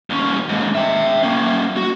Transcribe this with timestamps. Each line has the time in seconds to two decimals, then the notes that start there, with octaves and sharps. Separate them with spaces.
0.10 D#2 C#4
0.49 D#2 G#2
0.75 E5 G5
1.23 A#3 C#4
1.77 F#4